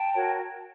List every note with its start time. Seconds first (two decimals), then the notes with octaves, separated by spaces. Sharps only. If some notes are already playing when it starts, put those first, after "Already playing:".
Already playing: G5 A5
0.14 F#4 A#4 C#5